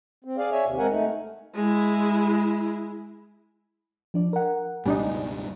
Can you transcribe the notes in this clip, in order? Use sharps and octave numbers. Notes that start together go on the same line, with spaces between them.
C4
G#4 D5 F5
C#5 E5 G#5
D#2 C3
G#3 C4 A#4 F#5 G#5
A3 D#4
G#3 E4
F3 D4 D5
A#4 F#5
C#2 G2 B2 G3 D4 D#4 G#5